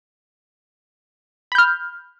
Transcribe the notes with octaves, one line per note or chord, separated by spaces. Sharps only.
B5 F6 G6